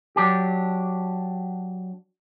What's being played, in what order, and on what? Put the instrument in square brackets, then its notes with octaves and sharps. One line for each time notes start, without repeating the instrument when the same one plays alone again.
[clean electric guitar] F#3 D4 G4